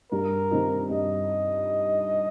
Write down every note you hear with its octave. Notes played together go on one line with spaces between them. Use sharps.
G2 A#4
D#3 G3 C4 D#4
G2 D#5